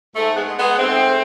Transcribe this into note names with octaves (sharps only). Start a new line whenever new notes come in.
G#2 A3
G#3 B3
G#3
G#3 B3
G#2 A3 C4